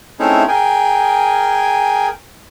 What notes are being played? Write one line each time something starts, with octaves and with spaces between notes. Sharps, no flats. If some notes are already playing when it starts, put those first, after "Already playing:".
A3 C4 C#4 D#4 E4 G#4
G#4 A#4 G5 G#5